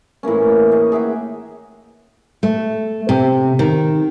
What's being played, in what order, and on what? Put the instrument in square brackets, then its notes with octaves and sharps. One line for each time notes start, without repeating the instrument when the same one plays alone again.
[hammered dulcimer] A2 E3 A#3 C#4
C#5
D#4 G#4 D#5
G#4 E5 F#5 G5
[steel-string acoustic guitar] A3
C3
D#3